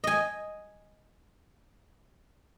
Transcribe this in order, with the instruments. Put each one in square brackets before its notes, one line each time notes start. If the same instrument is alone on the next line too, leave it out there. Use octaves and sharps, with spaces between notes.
[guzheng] D#5 G#5